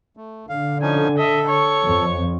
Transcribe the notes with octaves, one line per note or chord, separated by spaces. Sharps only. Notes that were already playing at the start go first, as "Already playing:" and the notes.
A3
D3 F5
F3 C#4 D#4 G#5
A4 D#5 E5
C#5 C#6
F2